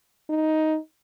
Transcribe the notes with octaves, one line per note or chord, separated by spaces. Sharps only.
D#4